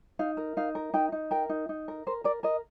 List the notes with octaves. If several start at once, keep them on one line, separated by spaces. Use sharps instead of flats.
D#4 F5
A#4
D#4 F5
A#4
D#4 G5
D#4
A#4 G5
D#4
D#4
A#4
A#4 C5
A#4 D5
A#4 D#5